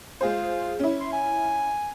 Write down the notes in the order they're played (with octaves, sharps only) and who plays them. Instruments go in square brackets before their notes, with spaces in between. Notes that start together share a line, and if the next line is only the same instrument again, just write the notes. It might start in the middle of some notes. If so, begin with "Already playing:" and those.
[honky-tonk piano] G#3 G#4 C5 [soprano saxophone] F4
[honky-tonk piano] C#4 E4
[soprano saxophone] C6
G#5